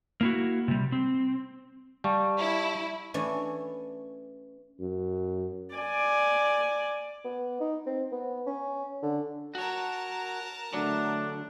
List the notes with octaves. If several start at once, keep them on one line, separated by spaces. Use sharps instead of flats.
A#3 E4 F#4
C3 G3
C4
G3 F5 A5 C#6
E4
E3 A3 C#4 D4
F#2
D5 G#5
B3
D#4
C4
B3
C#4
D3
F#4 A#4 C#5 A5 A#5
D3 F#3 A3 D4